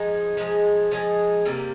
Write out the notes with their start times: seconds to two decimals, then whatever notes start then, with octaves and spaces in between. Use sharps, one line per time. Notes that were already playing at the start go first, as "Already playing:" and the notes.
Already playing: F3 G#3 D#4 G#4
0.37 F3 G#3 D#4 G#4
0.91 F3 G#3 D#4 G#4
1.45 C3 G3 A#3